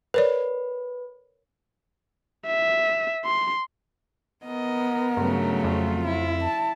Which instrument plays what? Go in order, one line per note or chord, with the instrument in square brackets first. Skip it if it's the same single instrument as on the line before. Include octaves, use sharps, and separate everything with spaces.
[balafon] A#4 C#5 D5 [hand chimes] B4
[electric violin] E5
C6
[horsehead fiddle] B3 A#4 [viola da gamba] D#5
[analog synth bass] G2 [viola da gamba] C#3 F#3 A3
[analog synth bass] F2 [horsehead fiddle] F4
[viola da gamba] E4
[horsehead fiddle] A5